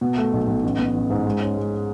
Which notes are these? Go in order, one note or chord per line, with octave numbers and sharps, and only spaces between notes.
B2
A3
B1
B1
A1
B3
A1
G#2
G#3
C#4
G#3